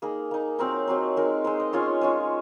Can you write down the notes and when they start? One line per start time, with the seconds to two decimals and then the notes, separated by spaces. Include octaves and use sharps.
0.02 A#3 D#4 G#4
0.31 A#3 D#4
0.59 F#3 C4 D#4 A#4
0.87 F#3 C4 D#4
1.17 G#3 D#4 A#4
1.44 G#3 D#4 C5
1.60 D#5
1.73 G#3 C#4 F4 C#5
2.01 G#3 C#4 F4